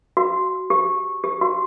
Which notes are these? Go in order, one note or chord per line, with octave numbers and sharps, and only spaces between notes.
F#4
G4
G4
F#4